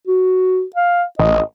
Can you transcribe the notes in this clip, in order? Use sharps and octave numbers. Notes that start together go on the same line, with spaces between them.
F#4
F5
A1 D#5